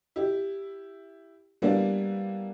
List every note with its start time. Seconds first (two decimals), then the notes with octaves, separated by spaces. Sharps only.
0.16 E4 G4
1.62 G3 A#3 B3 D4 E4